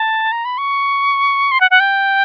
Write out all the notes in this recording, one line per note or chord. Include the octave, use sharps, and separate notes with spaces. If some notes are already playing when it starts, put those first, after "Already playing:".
Already playing: A5
A#5
B5
C#6
C6
F#5
F#5
G5